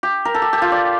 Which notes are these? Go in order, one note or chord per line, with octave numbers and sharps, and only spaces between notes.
G4
A#4
A4
G4
G4
F4
D5